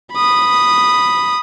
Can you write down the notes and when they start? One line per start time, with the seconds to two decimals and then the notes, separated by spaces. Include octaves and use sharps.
0.13 B5 D#6